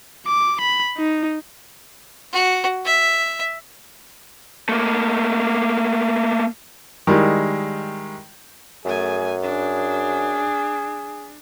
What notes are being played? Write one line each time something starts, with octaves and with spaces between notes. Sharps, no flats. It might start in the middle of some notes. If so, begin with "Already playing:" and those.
D6
B5
D#4
F#4
E5
A3 A#3
D#3 G3 G#3 E4
F#2 A3 G#4 G#5
D4 G#4